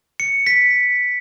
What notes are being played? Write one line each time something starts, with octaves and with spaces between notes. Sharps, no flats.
C#7
B6